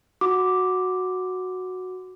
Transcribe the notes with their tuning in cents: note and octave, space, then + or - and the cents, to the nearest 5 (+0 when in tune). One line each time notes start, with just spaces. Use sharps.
F#4 -5 D6 +0